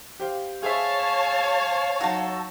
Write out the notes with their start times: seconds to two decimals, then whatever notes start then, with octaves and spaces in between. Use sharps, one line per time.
0.20 G4 C5 F5
0.63 G#4 C5 C#5 E5 F5 A5
2.01 F#3 D#4 F#4 A4